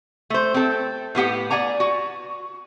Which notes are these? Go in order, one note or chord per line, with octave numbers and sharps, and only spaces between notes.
A3 C5
C4 A4
A2 B3 G4 F#5
D5 F#5 G#5 A#5
F#4